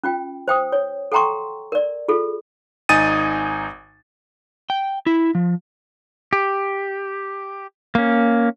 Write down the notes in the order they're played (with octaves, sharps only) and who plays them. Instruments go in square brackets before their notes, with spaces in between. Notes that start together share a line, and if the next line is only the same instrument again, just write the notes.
[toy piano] C#4 F4 G5
C5 G5 D#6
C#5
A4 F#5 G5 A#5 C6 C#6
A#4 D5
F4 G#4 A4
[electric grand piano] G#1 D#4 G#5 D#6 A6 D#7
[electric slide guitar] G5
E4
F3
[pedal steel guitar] G4
A#3 C#4